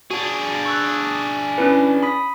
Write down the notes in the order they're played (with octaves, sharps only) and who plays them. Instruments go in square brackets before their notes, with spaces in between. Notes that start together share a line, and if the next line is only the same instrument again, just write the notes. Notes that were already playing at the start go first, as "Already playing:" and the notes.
[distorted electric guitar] D4 G#4 [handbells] F#4
[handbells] C#6 E6 F#6
C#4 E4 B4
B5 D#6 B6